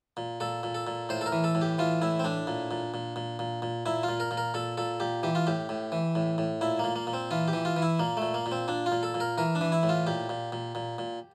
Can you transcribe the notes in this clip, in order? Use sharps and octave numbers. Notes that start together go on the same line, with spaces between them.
A#2
A#2 A4
A#2
A4
A#2
A2 C5
A4
A#4
E3
A4
A2
G4
E3 F4
A2 E4
C4
A2 D4
A#2
A#2
A#2
A#2
A#2
A#2
A#2 E4
F4
A#2
A#4
A#2
A#4
A#2 A4
A#2 A4
A#2 G4
E3 G4
F4
A2 G4
A2
E3
A2
A2
A#2 E4
A#2 A#3
A#3
A#2
C4
E3 F4
G4
E3
F4
E3
E4
A#2 A#3
A#2 A3
A#3
A#2
C4
A#2 D4
F4
A#2
A4
A#2
A#4
E3 A#4
D4
E3
E4
A2
F4
A#2 G4
A#2
A#2
A#2
A#2